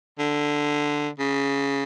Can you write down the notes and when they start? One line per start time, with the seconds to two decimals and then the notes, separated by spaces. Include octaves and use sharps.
0.19 D3
1.19 C#3